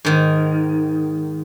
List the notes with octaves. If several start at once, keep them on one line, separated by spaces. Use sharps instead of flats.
G#2 D#3